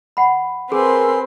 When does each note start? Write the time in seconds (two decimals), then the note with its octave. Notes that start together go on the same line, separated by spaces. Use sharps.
0.17 F#5 B5
0.72 C4 G#4 A#4 B4 G#5 C6 E6